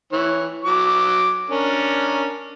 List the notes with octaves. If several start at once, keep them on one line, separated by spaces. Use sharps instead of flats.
E3 C#5
F#3 D6
C#4 D4 A#4